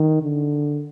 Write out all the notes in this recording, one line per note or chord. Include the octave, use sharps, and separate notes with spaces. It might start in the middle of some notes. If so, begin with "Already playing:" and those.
Already playing: D#3
D3